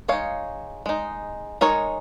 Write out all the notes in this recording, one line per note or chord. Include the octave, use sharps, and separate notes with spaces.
G#3 D#4 C#5 F5
G#3 D#4
G#3 D#4 A#4 C#5